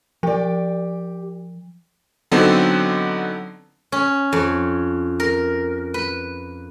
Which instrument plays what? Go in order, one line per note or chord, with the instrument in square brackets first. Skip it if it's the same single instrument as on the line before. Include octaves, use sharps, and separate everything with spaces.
[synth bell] F3 [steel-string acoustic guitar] G4 D5
[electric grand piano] D3 F#3 B3 C4 D#4 A4
[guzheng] C#4
F2
A#4
B4